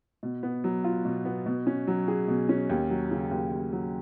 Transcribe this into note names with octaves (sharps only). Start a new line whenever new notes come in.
B2
B3
F#3
F4
B2
B3
B2
C#4
F#3
G#4
B2
C#4
D#2
F#3
C#3
D#2
D#2
F#3